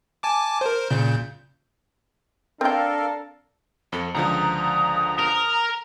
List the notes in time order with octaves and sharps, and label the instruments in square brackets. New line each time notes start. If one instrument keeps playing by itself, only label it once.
[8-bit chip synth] G#5 A5 D6
A#4 C5
A#2 C#3 G6
[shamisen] C4 G5 [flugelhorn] D4 [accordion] A4 A#4 F5
[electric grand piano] F2 [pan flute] A4
[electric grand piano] C#2 D3 F3 [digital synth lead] A#5 [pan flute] D#6
[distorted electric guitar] A#4